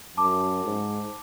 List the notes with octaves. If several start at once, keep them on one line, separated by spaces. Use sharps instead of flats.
F#2 A5 D6
G#2